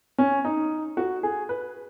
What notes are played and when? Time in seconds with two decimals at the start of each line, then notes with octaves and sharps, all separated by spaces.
0.18 C#4
0.45 D#4
0.97 F#4
1.23 G#4
1.49 B4